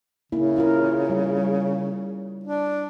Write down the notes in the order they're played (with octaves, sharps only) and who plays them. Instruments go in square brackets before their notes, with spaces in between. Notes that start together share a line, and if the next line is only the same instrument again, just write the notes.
[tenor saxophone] C#3 [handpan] A#3 E4
[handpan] E4 F4 A#4
G3
[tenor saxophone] D4